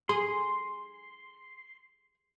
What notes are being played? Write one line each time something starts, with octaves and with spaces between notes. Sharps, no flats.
G#4 C6